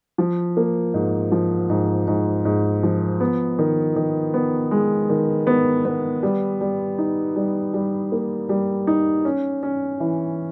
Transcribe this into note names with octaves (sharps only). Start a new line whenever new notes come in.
F3
A#3
G#2
F3
G#2
G#2
G#2
F3
B3
D#3
D#3
B3
G#3
D#3
B3
B3
G3
G3
D#4
G3
G3
A#3
G3
D#4
C#4
C#4
E3